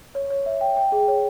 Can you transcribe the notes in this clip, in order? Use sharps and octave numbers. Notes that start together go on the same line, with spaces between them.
C#5
C#5
E5
G5
G5
G#4
C#5